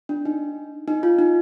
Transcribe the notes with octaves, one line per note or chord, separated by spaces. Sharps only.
D4
D#4
D#4
F4
D#4